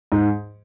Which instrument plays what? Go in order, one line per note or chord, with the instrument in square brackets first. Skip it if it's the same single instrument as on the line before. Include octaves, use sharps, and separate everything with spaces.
[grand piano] G#2